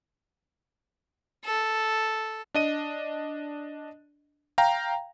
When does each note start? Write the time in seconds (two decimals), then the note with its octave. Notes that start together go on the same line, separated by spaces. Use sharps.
1.45 A4
2.54 D4 D#5 D#7
4.58 F5 G5 A#5